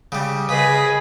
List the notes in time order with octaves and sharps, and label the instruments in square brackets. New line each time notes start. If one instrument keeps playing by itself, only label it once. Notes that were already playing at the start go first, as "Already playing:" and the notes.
[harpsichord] C#3 G3
[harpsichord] C#3 [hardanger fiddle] G#4 B4 [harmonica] D#5 B5